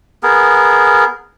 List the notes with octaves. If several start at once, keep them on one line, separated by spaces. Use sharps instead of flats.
B3 G#4 A#4